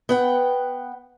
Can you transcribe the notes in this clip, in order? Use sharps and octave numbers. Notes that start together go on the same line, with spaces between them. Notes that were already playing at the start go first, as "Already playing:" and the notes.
B3 F#5 G5